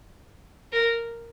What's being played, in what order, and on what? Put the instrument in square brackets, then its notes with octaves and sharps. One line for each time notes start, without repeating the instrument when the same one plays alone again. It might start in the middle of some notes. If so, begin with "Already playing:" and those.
[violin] A#4